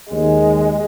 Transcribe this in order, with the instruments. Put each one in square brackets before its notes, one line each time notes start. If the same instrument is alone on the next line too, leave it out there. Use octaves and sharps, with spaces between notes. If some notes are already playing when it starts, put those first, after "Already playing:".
[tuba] D#2 [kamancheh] G#3